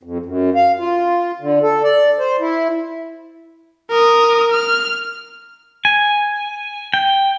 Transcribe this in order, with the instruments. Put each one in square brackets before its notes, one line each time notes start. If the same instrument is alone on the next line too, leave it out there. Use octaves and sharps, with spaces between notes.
[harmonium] F2
F#2
F5
F4
D3
A4
D5
C5
E4
[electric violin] A#4 D#6
F6
[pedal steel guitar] G#5
G5